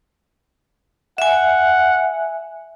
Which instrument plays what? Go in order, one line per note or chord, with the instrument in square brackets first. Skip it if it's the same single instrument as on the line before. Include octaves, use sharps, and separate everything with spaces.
[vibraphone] E5 G#5 [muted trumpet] F#5